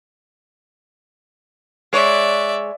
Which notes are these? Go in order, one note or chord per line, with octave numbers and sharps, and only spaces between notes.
G#3 C#5 D5 E5